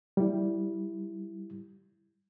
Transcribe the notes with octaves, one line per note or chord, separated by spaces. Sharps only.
G3 E4